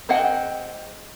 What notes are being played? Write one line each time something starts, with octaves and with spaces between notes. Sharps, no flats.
C4 G#4 D#5 F#5 G5